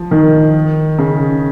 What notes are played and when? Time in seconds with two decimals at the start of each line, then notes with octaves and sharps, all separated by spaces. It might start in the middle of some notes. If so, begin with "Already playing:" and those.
Already playing: F3
0.11 D#3
0.99 C#3